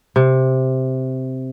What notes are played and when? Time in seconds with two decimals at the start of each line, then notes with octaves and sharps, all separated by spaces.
0.16 C3